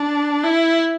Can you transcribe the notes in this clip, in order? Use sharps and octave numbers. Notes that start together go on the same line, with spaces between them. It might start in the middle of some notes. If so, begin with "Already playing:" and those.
Already playing: D4
E4